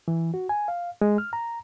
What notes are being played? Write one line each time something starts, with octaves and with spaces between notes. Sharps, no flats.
E3
F#4
G#5
F5
G#3
F6
A#5